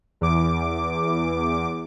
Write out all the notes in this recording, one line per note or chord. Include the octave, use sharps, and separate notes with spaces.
E2 D6